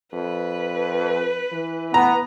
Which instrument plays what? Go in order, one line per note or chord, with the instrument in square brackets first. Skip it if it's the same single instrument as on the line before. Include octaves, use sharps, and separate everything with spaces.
[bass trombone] F2 [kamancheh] B4
[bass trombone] E3
[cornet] B3 [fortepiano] A#5